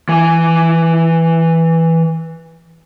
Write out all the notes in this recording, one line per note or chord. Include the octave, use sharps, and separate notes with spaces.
E3 G#5